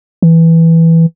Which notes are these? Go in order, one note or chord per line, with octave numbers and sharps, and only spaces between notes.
E3